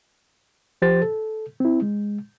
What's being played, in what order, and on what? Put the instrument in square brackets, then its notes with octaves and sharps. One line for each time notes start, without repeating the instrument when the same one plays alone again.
[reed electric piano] F3 G4 C5 A6
A4
C4 E4
G#3